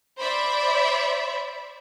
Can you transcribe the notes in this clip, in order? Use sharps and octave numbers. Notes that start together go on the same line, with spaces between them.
C5 D5 E5 B5